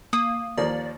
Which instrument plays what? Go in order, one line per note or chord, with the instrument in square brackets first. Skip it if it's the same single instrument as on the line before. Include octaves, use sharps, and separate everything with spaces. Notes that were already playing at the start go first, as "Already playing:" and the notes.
[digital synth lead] A#3 [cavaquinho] D#6
[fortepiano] D#2 F3 A#3 [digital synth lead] D5